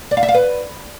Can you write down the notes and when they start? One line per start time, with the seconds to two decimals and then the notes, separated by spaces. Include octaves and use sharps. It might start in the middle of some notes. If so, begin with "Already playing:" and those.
0.11 D5
0.17 F5
0.23 E5
0.29 F5
0.34 B4